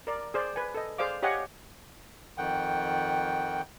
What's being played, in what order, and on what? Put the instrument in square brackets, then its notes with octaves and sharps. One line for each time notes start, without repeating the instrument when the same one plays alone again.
[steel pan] A#4 D5
G#4 C5 D5
B4 G#5
A4 D#5
G#4 C5 D5 F5 D6
G4 C#5 D#5 F5 F#5 G#5
[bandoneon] F2 D#3 F#5 G5